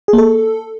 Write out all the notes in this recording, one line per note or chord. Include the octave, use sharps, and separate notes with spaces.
G#4
A#3
A4